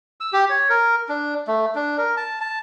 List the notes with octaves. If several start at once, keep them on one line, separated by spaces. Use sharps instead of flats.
E6
G4
C#5
A#4
D4
A3
D4
A#4
A5
A5